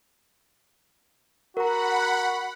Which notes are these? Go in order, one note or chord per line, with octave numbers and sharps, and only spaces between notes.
F#4 A#4 F#5 A#5 B5